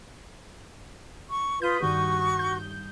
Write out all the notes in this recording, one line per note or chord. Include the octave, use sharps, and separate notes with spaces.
C#6
F4 B4 C6 D#6 G6
G2 D#3 G3 F#4 C#6
G6